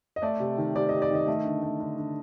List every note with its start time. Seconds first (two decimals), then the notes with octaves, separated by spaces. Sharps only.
0.16 D#5
0.22 A3 D5
0.40 C3
0.58 D#3
0.76 C3 D5
0.89 C3 D#5
1.02 D5
1.11 D#3 D#5
1.27 A3
1.45 D3
1.63 A3
1.80 D3
1.98 D3